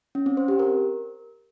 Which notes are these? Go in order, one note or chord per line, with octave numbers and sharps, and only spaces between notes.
C#4
C4
C5
G4
A#4